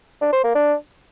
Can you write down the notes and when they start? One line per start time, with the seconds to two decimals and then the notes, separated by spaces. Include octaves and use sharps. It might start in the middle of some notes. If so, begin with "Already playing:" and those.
0.21 D4
0.33 C5
0.44 A#3
0.55 D4